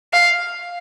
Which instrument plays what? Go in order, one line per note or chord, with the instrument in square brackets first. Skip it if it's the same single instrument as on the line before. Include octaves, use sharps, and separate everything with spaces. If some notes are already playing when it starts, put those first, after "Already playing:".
[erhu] F5